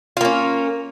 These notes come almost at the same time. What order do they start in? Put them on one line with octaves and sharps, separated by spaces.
F4 A#3 C#4